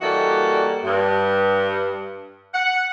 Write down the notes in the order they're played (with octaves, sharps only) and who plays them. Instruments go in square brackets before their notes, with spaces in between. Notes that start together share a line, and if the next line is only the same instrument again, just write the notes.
[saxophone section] E3 G3 A#3 F#4 A4 D#5
G2
F#5